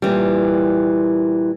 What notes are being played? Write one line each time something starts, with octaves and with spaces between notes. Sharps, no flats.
A#2 E3 G3